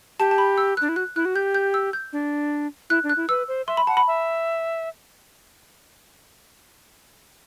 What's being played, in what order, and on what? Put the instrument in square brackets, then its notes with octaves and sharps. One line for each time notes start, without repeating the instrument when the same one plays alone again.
[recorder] G4 [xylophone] A5
[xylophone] A5
B5
E6
F#6
[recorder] D4
E4
[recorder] F#4 [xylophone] F#6
[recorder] E4 [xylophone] F#6
[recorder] F#4
[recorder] G4 [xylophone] G6
[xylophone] G6
E6
G6
[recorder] D4
[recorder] E4 [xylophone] F#6
[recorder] D4
[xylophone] F#6
[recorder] E4
[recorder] B4 [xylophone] E6
[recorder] C5
[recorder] E5 [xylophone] C6
[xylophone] B5
[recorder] F#5 [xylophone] A5
[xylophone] B5
[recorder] E5